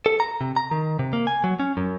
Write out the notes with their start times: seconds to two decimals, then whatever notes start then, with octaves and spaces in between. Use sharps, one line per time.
0.06 A4
0.20 A#5
0.41 C3
0.56 A#5
0.71 D#3
0.99 C3
1.13 A#3
1.27 G#5
1.44 F#3
1.60 C#4
1.77 F#2